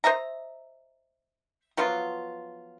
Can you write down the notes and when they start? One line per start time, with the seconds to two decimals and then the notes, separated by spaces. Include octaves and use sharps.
0.04 C5 D#5 E5 A#5
1.77 F3 F#3 B3 F4